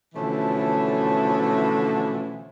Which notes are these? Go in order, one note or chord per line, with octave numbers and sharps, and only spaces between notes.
B2 D3 E3 F3 A3 C#4